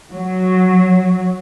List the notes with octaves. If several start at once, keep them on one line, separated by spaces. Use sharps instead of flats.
F#3